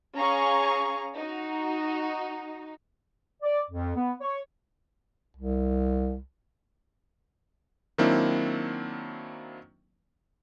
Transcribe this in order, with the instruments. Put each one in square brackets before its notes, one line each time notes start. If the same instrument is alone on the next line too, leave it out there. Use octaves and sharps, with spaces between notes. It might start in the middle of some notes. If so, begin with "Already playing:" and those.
[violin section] C#4 G#4 F5 A#5 C#6
D#4 F#4
[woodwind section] D5
F2
B3
C#5
[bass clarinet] C2
[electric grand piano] D#3 F#3 A#3 C4 D4 E4